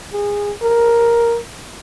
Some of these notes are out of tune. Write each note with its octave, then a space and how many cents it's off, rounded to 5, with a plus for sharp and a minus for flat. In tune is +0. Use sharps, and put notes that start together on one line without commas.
G#4 -20
A#4 +5